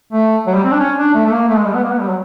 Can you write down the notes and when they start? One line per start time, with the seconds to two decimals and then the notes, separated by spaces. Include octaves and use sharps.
0.13 A3
0.47 F#3
0.55 G3
0.64 C4
0.72 D4
0.80 C#4
0.98 D4
1.14 A3
1.25 A3
1.32 A#3
1.49 A3
1.57 G#3
1.65 G3
1.74 B3
1.83 A#3
1.91 B3
2.00 G3
2.09 F#3